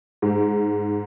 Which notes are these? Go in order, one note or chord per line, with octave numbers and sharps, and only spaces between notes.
G#2